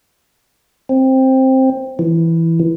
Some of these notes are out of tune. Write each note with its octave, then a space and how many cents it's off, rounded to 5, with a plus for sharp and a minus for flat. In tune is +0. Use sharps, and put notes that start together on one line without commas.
C4 +10
E3 +0